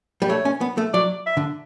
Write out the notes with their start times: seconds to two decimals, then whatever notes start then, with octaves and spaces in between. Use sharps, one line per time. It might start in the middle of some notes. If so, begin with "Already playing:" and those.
0.22 G3
0.29 A3 C#5
0.45 C#4
0.61 B3
0.78 A3
0.94 F#3 D5
1.26 E5
1.37 D3